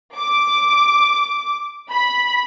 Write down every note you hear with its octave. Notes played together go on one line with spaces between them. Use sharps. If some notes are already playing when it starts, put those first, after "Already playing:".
D6
B5